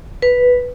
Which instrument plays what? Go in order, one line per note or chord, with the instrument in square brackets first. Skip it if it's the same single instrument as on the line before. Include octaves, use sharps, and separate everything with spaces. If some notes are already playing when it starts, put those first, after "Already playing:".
[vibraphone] B4